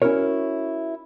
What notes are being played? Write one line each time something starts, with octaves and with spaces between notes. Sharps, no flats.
C#4 E4 F#4 A#4 C#5